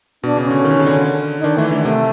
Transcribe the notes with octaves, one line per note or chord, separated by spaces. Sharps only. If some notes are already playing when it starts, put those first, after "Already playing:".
B2 D4
C#3
C#4
D3
D#3
D3
C#3
D3
D#4
D#3 D4
E3 A3
D3 A3
C3 A3